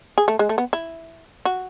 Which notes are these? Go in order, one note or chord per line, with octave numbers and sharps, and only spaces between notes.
G#4
A3
G#3
A3
B3
E4
F#4